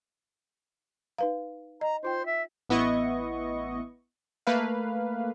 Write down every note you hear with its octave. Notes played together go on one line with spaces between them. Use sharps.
D#4 B4 F5
D#5 A#5
D#4 F4 C5 G5
E5
A1 B3 E4 D#5 C#6
A3 A#3 B4 F5